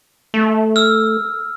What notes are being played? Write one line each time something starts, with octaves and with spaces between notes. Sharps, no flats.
A3
E6 F6